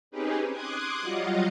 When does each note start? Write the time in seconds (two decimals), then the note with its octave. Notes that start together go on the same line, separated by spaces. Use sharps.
0.11 C4 C#4 D#4 G4 G#4 B4
0.50 C6 D6 D#6 F#6 G#6
1.02 F#3 G3 F4 D#5 F5 F#5